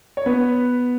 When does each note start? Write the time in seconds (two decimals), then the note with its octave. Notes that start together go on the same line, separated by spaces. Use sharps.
0.17 C#5
0.26 B3 B4